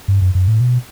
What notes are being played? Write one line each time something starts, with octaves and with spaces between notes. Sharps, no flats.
G2
F#2
F#2
A2
B2